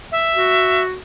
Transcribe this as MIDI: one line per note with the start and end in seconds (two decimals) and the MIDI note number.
0.12 0.82 76
0.35 0.98 66